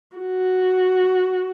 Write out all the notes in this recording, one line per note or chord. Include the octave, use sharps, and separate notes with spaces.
F#4